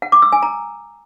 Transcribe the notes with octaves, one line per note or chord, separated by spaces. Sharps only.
F#5
D6
E6
G#5
A#5